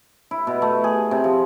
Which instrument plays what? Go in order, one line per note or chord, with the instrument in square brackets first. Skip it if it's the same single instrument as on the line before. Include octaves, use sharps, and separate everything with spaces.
[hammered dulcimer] E4
B2
A3
G#4
C3
F3